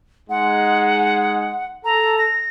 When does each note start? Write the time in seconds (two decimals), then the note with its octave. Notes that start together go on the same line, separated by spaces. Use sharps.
0.30 G#3 D#4 F#5
1.85 A4 A#5
2.18 A#6